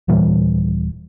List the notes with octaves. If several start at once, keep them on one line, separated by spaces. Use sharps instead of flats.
D#1 A#2 E3 G3